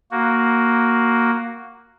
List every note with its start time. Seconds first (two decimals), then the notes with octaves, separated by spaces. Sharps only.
0.11 A#3 F#4